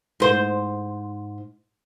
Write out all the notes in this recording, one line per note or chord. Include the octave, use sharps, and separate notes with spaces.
G#2 C5